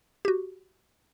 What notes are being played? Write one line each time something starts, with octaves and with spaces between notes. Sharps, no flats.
F#4 G4